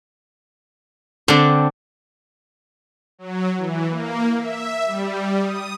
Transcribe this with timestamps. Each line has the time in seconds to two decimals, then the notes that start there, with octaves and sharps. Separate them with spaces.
1.28 D3 C4 D4
3.19 F#3
3.57 E3
3.90 A#3
4.38 E5
4.86 G3
5.42 D#6